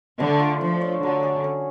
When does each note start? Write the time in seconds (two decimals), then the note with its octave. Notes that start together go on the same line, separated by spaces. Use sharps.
0.19 D3 A3
0.40 F4
0.61 F3 D4
0.81 C#5
1.02 D3 F#3
1.23 G#4
1.44 C#4